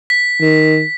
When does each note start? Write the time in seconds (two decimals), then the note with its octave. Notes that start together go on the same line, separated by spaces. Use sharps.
0.10 B6
0.41 D#3